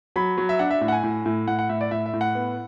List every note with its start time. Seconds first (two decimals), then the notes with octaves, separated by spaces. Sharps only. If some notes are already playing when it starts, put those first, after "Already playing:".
0.16 F#3 B5
0.38 F#3
0.49 E5
0.59 D4 F#5
0.71 E5
0.81 A2 E5
0.88 F#5
0.92 G#5
1.04 A2
1.26 A2
1.48 A2 F#5
1.59 F#5
1.69 A2 E5
1.81 D5
1.91 A2 E5
2.06 E5
2.14 A2
2.21 F#5
2.35 B3